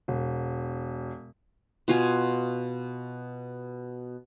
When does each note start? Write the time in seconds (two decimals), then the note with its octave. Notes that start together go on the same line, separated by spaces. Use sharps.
0.08 E1
1.88 B2 F4 G#5